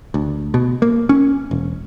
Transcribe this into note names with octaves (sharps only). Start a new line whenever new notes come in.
D2
B2
A#3
C#4
E1